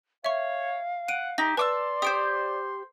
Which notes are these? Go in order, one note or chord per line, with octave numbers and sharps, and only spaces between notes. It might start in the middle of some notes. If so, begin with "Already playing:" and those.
C#5 E5 F5 C#6
F#5 D7 D#7
D#4 G4 A#6
B4 D5 A5 C6 D6 E6
G4 C5 D#6 D7